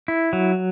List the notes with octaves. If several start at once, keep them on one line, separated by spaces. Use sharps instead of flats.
E4
F#3